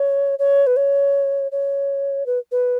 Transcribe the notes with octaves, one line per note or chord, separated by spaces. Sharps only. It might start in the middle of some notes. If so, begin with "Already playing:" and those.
Already playing: C#5
C#5
B4
C#5
C#5
B4
B4